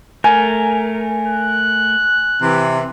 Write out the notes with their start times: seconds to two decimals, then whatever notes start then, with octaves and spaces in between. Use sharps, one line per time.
0.24 A3 A#4 G#5
1.27 F#6
2.42 C3 E3